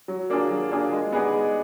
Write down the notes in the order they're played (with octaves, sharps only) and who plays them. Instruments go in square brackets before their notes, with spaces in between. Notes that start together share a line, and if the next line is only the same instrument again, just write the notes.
[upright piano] F#3
A#3 D4 F4 G#4
F#3
A#3 D4 F4 G#4
G#3
B3 D#4 G#4 D5
G#3